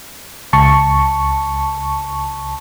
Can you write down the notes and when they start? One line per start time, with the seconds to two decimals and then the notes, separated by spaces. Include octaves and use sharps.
0.53 C#2 A5 C#6